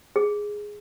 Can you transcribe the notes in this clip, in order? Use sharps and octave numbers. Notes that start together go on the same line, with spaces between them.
G#4